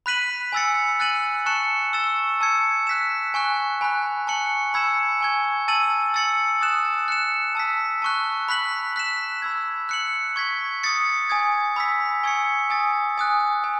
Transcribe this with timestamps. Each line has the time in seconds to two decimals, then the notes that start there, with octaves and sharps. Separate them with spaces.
0.06 B5 F#6 B6 D#7 F#7
0.52 G#5 B5 E6 A6 C#7
1.00 F#6 A6 D#7 F#7
1.46 A5 C#6 F#6 C#7 E7
1.93 C#6 E6 A6 E7
2.41 A5 E6 G#6 C#7
2.87 F#6 B6 E7
3.34 G#5 C#6 F#6
3.81 G#5 B5 F#6
4.27 A5 C#6 F#6 C#7 F#7
4.74 B5 E6 G#6 C#7 E7
5.21 G#5 C#6 G#6
5.68 A5 E6 A6 D#7 F#7
6.14 E6 A6 C#7 F#7
6.61 D#6 F#6 A6 E7
7.08 F#6 C#7 E7
7.55 A5 E6 B6
8.02 A5 C#6 F#6
8.48 B5 F#6 B6 F#7
8.96 F#6 B6 E7
9.42 B5 E6 G#6
9.89 F#6 C#7 F#7
10.36 C#6 G#6 B6
10.83 D#6 A6 C#7
11.30 G#5 D#6 G#6
11.76 B5 E6 B6
12.23 G#5 C#6 E6 G#6 C#7
12.70 G#5 D#6 A6
13.18 G#5 D#6 F#6
13.64 G#5